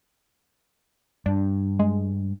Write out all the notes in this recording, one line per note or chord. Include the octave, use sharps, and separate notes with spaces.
G2 D4
G#3